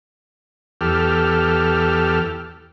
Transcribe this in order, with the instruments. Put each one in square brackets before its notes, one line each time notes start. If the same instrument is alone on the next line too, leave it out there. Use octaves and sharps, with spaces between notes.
[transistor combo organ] E2 G4 A4 F6